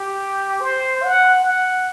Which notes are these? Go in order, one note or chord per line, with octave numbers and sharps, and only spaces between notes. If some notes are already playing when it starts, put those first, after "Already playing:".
Already playing: G4
C5
F#5
F#5